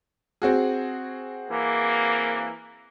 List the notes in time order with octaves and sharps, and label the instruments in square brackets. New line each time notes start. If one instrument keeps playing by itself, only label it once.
[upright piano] C4 F#4 G#4
[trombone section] E3 A#3